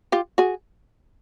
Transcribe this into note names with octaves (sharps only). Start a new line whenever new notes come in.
F4 G4
F#4 G#4